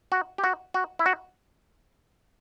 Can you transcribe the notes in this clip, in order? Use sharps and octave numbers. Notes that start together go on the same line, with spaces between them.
F#4
G4
F#4
F#4
E4
F#4